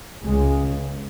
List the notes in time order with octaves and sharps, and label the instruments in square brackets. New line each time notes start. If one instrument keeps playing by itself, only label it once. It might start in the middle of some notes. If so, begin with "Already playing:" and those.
[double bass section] C#2 C#3 G#3